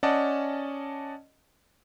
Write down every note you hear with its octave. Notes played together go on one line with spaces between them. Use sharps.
C#4 D5 D#5 F#5 A5